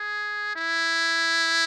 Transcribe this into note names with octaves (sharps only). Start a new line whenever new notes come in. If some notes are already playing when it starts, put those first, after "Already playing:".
Already playing: G#4
E4